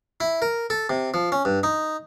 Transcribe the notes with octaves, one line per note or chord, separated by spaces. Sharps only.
E4
A#4
A4
C3
F3
C#4
G2
D#4